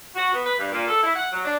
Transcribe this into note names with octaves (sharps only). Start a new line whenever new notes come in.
F#4
B3
B4
G2
A#2
A4
E4
F#5
F#3
D4